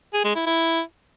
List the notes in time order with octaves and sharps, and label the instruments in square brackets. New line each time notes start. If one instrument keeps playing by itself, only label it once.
[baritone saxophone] G#4
G#3
E4
E4